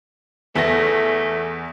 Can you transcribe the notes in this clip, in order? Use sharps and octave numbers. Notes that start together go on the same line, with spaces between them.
E2 A3 B3 E4 A4 A#6